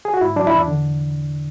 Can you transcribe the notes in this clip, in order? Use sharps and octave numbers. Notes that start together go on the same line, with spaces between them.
G#4
F#4
G#2 E4
F#3 D4
E4
E2 D4
D3